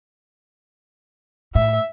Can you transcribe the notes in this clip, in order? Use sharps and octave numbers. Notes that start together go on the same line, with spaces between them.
A2 E5